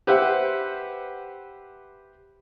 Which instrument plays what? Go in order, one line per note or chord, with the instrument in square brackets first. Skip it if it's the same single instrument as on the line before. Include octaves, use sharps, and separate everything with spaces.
[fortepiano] G4 B4 C5 E5 F#5